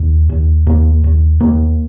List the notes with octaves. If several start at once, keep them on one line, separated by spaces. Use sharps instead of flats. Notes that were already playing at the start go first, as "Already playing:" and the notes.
Already playing: D#2
D#2
D#2 A#3
D#2
D#2 A#3